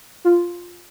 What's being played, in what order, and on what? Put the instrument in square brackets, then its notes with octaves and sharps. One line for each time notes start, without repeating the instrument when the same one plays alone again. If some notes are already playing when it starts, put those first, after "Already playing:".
[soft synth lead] F4